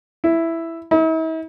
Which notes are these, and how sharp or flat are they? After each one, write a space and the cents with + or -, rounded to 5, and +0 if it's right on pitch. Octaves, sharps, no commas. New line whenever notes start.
E4 +5
E4 -45